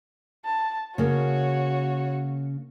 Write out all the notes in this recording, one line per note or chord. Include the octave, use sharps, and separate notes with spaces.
A5
C#3 A#3 F#4 C#5